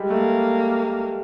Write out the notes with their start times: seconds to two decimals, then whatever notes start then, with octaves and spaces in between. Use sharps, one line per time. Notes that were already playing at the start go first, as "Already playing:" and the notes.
Already playing: G3 G#3
0.10 A3 A#3